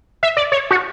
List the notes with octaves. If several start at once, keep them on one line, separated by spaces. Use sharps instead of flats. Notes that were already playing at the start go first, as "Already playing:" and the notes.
E5
D5
C#5
F#4